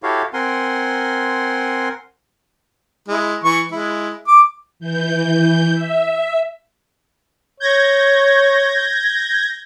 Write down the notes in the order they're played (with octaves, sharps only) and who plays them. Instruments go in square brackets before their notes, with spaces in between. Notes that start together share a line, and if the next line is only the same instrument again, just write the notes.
[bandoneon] E4 F#4 G4 A4 C#5 F5
C4 A#4 F#5 G#5 C6
[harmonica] G#3 E4
E3 C#6
G#3 E4
D6
[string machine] E3 G6
E5
[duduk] C#5 [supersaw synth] G6 G#6 A#6